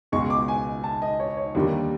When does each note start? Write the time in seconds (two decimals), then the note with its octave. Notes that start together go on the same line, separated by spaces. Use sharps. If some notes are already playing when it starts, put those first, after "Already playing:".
0.12 C#2 B2 G#3 C#6
0.30 D6
0.48 G#5
0.84 A5
1.02 D#5
1.20 C#5
1.37 C#5
1.55 D#2 D3 G3 A#3